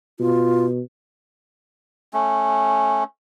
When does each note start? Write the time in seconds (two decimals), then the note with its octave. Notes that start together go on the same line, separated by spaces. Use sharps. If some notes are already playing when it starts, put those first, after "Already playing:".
0.20 B2 F4
2.14 A3 C#4